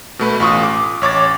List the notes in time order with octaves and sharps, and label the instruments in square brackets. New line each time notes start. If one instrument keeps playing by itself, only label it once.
[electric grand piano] B2 A3 B4
A1 F4 C#6 D#6
D6
A1 C#5 D6 A6